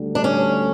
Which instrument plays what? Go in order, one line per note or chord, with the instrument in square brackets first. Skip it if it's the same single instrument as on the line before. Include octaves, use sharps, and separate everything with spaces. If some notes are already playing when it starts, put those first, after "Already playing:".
Already playing: [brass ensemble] D2 D3 G3
[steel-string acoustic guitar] D4
C#4